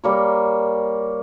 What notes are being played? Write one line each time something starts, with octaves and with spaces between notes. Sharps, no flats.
G3 A#3 C#5